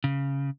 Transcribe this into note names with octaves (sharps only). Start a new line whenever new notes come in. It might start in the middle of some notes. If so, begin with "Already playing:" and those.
C#3